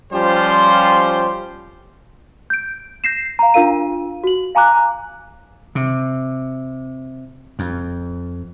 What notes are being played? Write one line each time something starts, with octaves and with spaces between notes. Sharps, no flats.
F3 G3 C#4 F4 G4 C5
G6 D7
G6 A#6 C7 E7
F5 A#5
D4 F4 A#4 F5 D#7
F#4 F#7
F5 G#5 A#5 D6 F#6
C3
F2